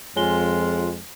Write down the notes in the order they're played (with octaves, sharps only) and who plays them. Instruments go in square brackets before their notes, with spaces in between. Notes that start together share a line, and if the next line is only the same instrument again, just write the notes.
[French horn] F2 [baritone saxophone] G#3 [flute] F4 [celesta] C#5 G#5 G7